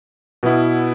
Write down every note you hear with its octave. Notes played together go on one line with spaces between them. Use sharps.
B2 B3 E4